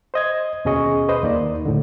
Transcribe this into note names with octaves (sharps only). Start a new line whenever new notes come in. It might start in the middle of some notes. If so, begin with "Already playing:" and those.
C5 D#5 G#6
D#2 B2 C#4 G#4 D#5 C#6
B4 C5 D#5
D#2 A#3 D#4 D5
A2 D3